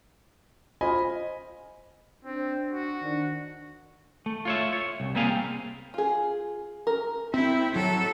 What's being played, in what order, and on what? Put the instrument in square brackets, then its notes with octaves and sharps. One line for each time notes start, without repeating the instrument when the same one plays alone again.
[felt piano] F4 C5 [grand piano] D#5 G#5 B5
[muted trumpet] C4 [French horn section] D4 C5
[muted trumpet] F#4
[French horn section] D#3 D4
[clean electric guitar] A3
F4 C#5 E5
C#5
C2
G3 A#3 C4 G#4 F5
[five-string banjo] F4 G#4
A#4
[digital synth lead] C4 [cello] E4
[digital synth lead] F#3 [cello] A4